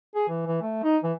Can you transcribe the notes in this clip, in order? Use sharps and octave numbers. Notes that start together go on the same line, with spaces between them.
G#4
E3
E3
A3
D#4
E3